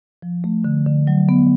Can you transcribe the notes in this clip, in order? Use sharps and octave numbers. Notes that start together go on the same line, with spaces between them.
F3
A3
D3
D3
F#3
B3